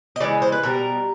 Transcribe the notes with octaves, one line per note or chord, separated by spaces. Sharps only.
D#5
C#3 E3 G#3 D5
C5
B4
B2 G3 A#4